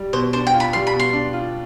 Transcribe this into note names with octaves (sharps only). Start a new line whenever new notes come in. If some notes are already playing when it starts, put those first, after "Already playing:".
Already playing: G3
B2 C5
D4 C5
G5
F4
B5
G3 C6
B5
B2
C6
D4
F4